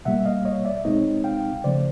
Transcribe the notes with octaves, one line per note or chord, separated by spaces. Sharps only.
B2 G3 A#3 E5 F#5
D#5 F5
C#5 D#5
D5 E5
C2 B2 G#3 C4 D#4 C#5 D#5
F5 G5
C#3 F3 A3 C5 D5